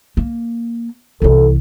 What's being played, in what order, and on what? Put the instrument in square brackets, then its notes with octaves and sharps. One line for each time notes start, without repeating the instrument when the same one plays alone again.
[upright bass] A#3
[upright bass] C2 E3 [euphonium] A4